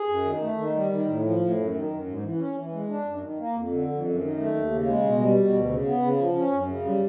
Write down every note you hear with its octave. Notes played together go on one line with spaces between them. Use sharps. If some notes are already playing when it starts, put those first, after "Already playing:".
Already playing: G#4
F#2
D#3
A3
D#3
G3
D#3
A2
F3
A2
F#2
D#3
F#2
G#2
E3
C#4
E3
G#3
D4
F#2
D#3
A#3
F2
D3
F2
F#2
D#3
A3
D#2
C#3
G#3
B2
G3
B2
D2
C#3
B3
C#3
F3
C#4
F#2
C#3
G3